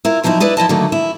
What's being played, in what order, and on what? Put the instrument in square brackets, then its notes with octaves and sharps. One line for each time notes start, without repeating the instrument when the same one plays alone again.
[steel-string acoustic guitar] E4 F4 A#4
C3 F3 F#3 D#4 E4
E4 B4 D5 D#5
F3 E4 D#5 A5
D3 D#3 F#3 A3 A#3
E4